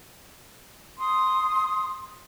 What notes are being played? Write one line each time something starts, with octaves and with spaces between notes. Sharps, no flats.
C6 D#6